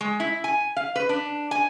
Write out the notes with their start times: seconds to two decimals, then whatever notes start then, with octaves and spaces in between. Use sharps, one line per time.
0.01 G#3
0.20 E4
0.44 G#5
0.76 F5
0.96 B4
1.09 D4
1.51 G#5